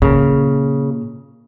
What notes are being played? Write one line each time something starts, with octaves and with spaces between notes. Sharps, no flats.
A#2 C#3 A#4